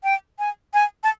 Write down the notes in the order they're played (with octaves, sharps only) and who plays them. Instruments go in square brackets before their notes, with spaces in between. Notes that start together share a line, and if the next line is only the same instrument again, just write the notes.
[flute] G5
G#5
G#5
A5